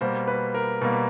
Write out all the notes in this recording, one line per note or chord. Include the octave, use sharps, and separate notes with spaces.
B2 G3 A#3 C5
B4
A#4
B2 G3 A#3